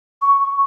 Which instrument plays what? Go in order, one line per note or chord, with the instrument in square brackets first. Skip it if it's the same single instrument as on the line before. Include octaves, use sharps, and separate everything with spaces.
[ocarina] C#6